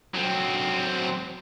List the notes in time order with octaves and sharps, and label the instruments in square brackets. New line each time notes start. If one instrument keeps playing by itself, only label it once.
[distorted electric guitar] F#3 C4